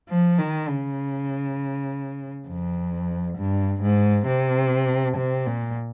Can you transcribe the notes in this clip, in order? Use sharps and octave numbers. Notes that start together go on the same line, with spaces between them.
F3
D#3
C#3
F2
G2
G#2
C3
C3
A#2